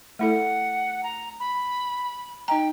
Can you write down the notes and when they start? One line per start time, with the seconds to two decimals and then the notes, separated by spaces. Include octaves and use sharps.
0.19 A3 E4 A4 F#5
1.03 A#5
1.40 B5
2.48 D#4 D#5 G5 A#5